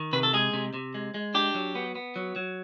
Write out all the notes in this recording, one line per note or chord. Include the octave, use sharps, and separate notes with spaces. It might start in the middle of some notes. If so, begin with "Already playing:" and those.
Already playing: D#3
C3 B4
A4
G#3 G#4
C3
C3
G#3
G#3
D4 G4
F#3
B3
B3
F#3
F#3